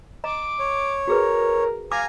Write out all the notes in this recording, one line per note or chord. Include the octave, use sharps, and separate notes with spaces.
D#5 A#5 D6
C#5
F#4 G#4 A#4 B4
F5 G#5 A#5 D6